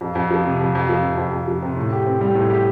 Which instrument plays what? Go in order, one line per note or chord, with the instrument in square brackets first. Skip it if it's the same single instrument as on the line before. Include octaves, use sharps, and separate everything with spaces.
[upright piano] F2
F2
F3
C3
F2
F2
F3
C3
F2
F2
F3
C3
A2
G4
C4
G3
A2
G4